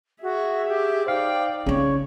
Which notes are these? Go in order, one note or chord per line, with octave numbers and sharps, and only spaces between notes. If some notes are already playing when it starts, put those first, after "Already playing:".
F#4 G#4 E5
G4
D#4 C5 D5 F5 G5
C#3 C4 E4 C#5